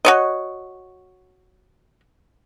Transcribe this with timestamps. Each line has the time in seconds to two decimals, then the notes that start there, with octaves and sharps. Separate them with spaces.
0.05 F#4 C#5 D#5